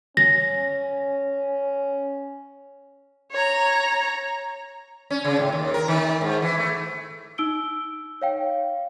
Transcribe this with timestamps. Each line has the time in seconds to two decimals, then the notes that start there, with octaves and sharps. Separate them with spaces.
0.17 C#4 A#6
3.31 C#5 A#5
5.11 C#4
5.25 C#3
5.39 A2
5.52 D#2
5.74 A#4
5.88 D#3
6.21 G#2
6.42 E3
6.58 A3
7.38 D#4 E6 D7 G7
8.22 C#5 F5 G5